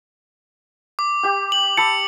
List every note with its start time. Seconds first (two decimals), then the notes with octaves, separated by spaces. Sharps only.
0.99 D6
1.23 G4 G5
1.52 F#7
1.77 A5 B5 E6 C#7